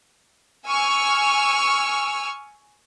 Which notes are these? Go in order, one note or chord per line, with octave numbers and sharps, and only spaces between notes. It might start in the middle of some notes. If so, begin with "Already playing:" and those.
G#5 C#6 E6 F6